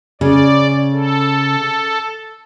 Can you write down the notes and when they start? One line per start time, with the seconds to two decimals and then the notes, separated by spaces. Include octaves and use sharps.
0.21 C#3 D5
0.93 A4